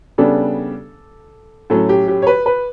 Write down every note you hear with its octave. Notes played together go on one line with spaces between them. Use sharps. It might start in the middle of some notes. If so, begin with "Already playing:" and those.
C#3 G3 B3 D4 A4
A2 F#3 C#4 A4
G4
G4
C#5
B4
B4